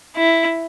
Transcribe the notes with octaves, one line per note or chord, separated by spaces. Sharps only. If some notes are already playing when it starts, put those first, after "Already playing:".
E4